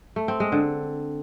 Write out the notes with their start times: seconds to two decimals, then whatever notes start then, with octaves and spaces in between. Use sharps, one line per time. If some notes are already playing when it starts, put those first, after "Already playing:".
0.16 A3
0.28 C4
0.40 G#3
0.52 D3